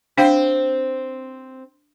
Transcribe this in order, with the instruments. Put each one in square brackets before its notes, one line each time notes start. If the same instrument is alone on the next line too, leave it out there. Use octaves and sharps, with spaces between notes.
[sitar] C4 C5 [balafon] D4 F5 G5